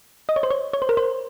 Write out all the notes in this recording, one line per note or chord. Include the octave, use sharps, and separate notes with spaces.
D#5
C#5
C5
C#5
C#5
C5
A#4
C5